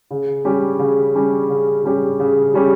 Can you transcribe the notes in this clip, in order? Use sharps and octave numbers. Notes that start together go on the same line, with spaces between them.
C#3
G3 C#4 G4
C#3
G3 C#4 G4
C#3
G3 C#4 G4
C#3
G3 C#4 G4